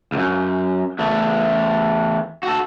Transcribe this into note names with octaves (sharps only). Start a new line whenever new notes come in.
C#2 F#2
E2 A3
F#4 A4